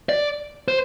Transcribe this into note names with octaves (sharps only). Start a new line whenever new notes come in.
D5
C5